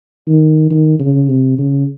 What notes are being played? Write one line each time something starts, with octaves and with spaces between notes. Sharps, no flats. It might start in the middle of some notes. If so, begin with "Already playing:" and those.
D#3
D#3
C#3
C3
C#3